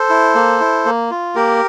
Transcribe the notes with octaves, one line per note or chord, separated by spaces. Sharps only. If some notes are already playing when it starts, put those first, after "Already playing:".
Already playing: A4 C5
E4
A#3
E4
A#3
F4
A#3 G4 A#4